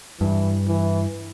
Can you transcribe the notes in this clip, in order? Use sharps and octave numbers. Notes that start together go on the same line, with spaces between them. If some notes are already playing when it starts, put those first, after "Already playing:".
G2 E3
E3